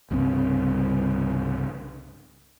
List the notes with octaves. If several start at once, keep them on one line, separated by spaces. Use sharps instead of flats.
C2 G2 C#3 C4